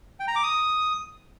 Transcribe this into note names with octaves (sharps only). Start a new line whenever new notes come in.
G5
A#5
D6
D#6